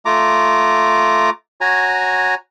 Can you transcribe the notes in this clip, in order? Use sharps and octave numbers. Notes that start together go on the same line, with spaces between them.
A3 F4 A#5 D6
F#4 C#5 G#5 A#5